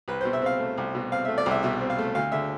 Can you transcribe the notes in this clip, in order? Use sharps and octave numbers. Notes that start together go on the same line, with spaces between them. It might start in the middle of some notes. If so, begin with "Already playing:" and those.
C2 B4
B2 C5
E5
C4 F5
A3
C2
B2
C4 F5
A3 E5
D5
C2 E5
B2 E5
C4
F5
A3
D2 F5
D3 E5